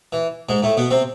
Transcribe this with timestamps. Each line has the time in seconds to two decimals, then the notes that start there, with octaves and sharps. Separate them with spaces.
0.13 E3
0.49 G#2 G#3
0.63 A2 A3
0.77 B2 B3
0.91 C3 C4